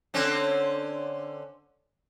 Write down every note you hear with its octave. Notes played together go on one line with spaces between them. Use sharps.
D3 C4 C#4